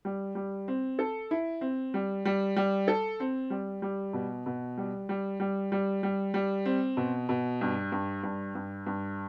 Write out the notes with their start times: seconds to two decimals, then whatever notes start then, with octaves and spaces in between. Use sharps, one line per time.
0.05 G3
0.35 G3
0.68 C4
0.99 A4
1.31 E4
1.61 C4
1.94 G3
2.25 G3
2.56 G3
2.88 A4
3.20 C4
3.50 G3
3.82 G3
4.13 B2
4.46 B2
4.78 G3
5.09 G3
5.40 G3
5.72 G3
6.03 G3
6.34 G3
6.65 C4
6.97 B2
7.29 B2
7.61 G2
7.92 G2
8.23 G2
8.55 G2
8.86 G2